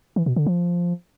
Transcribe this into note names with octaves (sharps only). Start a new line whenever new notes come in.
E3
B2
D3
F3